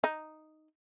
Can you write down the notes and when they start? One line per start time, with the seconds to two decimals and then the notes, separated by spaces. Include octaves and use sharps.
0.04 D#4